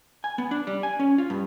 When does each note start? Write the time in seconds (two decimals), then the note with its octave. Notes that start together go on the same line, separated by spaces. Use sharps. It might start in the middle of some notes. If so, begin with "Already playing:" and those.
0.24 G#5
0.38 B3
0.51 D4
0.67 G3
0.83 G#5
0.99 C#4
1.18 F4
1.30 G2